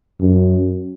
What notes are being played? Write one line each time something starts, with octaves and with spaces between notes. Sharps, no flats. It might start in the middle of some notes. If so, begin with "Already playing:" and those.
F#2